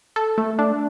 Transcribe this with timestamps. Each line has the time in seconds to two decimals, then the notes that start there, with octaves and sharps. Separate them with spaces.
0.16 A4
0.38 A3
0.59 D4